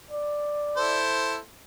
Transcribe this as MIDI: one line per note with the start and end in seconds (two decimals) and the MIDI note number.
0.11 1.04 74
0.77 1.38 64
0.77 1.38 69
0.77 1.38 72